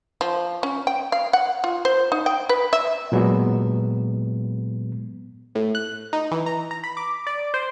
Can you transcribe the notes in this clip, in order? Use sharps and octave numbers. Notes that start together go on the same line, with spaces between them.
F3
C#4
G5
F5
F#5
F4
C5
D#4
G5
B4
E5
A#2 F#3 G#3 B3
A2
F#6
D#4
E3
A#5
A#5
B5
D6
D5
C5